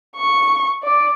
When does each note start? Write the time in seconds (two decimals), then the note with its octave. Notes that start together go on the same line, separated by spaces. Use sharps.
0.16 C#6
0.83 D5